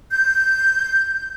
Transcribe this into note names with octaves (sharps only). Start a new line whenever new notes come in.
G6